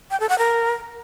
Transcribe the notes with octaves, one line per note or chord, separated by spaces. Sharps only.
G5
A4
F#5
A#4